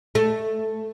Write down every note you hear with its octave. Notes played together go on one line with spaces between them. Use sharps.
A3